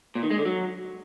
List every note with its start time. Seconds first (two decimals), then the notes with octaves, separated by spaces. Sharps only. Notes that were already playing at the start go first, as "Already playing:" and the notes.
0.15 A#2
0.23 D#3
0.30 G#3
0.38 D3
0.45 F#3